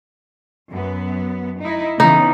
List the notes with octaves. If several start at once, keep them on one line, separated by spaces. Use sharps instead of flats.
F#2 B3
D#4 E4
C#3 E3 B3 D#4